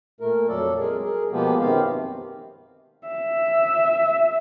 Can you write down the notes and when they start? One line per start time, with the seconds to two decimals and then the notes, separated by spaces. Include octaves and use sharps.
0.20 A#2 A3 A#4
0.48 F2 F#3 A4 D5
0.79 G#3 G#4 A#4
1.03 G#4 A#4
1.32 B2 F3 G#3 A#3 B3 G4
1.60 F#2 D#3 B3 C4 G4 F5
3.07 E5